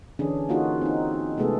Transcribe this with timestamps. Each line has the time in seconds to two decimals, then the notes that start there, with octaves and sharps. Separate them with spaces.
0.19 D3 E3 C#4 D4 G#4
0.49 A#3 D#4 F4 F#4 G#4
0.82 C4 D#4
1.37 C3 G#3 A3 B3 G#4 A4